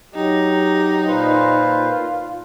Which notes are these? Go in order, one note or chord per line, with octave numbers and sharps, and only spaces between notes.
F#3 D#4 G4
A#2 F4 B4 C5